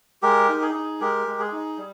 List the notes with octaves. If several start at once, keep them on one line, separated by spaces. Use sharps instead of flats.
G#3 G4 A#4
D#4
G#4
D#4
G#3 G4 A#4
G#3
G#4
D#4
G3